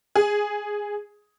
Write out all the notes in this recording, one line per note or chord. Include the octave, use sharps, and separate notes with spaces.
G#4